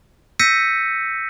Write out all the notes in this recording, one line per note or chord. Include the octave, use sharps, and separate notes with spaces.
E6 G6 A#6 B6 C#7 D#7